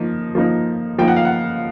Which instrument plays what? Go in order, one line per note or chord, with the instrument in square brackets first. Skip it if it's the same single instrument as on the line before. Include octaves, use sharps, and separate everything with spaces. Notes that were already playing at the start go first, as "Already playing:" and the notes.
Already playing: [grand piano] F3 A#3 D#4
F3 A#3 D#4
F3 A#3 D#4 G5
F#5
F5
F#5